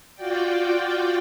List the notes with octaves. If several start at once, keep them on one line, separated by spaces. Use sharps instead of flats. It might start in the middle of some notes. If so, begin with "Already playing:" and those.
F4 F#4 D5 G5